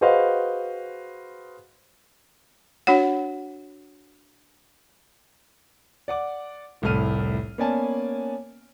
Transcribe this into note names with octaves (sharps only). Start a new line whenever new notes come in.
F#4 G#4 B4 C5 D#5 F5
D4 F#4 C#5 F#5
D5 F#5 D6
F1 C2 A2 A4 F6 D#7
A#3 B3 C#4 D5 G#5 A5